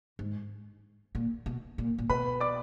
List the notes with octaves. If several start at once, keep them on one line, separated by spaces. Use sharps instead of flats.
G#2
A#2
B2
A#2
A#2
B2 B4 B5
D5 D6